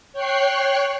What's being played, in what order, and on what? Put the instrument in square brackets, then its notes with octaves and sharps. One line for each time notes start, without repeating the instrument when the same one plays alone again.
[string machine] C#5 G5 C#6 F#6 C7